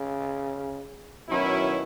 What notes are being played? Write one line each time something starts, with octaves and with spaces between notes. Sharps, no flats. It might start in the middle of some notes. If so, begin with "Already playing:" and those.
Already playing: C#3
B2 D#3 F#3 C#4 E4